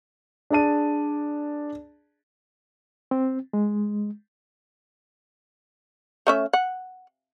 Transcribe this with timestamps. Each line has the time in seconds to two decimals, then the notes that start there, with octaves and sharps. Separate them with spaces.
0.50 D4 G#4 D5 A5 D#7
3.11 C4
3.53 G#3
6.27 A3 C#4 E5
6.53 F#5